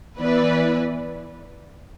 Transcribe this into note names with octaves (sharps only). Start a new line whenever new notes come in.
E3 B3 E4 B4 D5